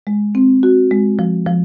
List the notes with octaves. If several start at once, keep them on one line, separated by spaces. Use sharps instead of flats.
G#3
C4
F#4
G#3
F3
F3